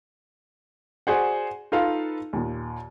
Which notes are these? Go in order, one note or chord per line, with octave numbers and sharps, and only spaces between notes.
F#4 G#4 C5 D5 F#5
D#4 F4 A4 B4 F5
D#2 A#2